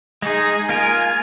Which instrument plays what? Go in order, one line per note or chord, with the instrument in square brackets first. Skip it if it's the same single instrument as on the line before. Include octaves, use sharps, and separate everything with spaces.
[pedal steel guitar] G#3 D#4 [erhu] G#4
[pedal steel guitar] A#3 F4 A#4 [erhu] G#5